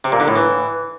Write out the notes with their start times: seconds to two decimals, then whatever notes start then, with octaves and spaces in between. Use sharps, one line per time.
0.04 C3
0.12 A#2
0.20 D3
0.28 A2
0.36 E3